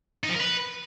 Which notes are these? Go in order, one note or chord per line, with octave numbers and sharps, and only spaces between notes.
D#4
F3
A#4
B4